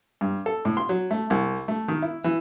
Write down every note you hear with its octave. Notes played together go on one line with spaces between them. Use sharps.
G2
A4
A2
C6
F#3
A3
C2
A3
D#3
E4
E3